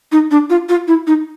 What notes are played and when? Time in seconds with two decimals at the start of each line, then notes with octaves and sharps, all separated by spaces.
0.12 D#4
0.31 D4
0.50 F4
0.69 F4
0.88 E4
1.07 D#4